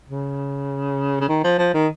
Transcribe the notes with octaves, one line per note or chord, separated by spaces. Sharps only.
C#3
C#3
D#3
F3
F3
D#3